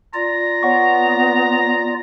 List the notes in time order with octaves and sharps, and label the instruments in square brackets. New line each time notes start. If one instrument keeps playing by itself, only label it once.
[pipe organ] F4 D5 [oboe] A#5
[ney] B3 [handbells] C#5 F#5 C#6